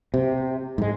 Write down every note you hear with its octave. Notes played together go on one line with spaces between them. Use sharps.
C3
G#2 G#3